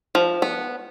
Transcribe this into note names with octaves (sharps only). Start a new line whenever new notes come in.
F3
B3